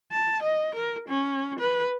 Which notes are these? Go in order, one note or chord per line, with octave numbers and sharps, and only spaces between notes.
A5
D#5
A#4
C#4
B4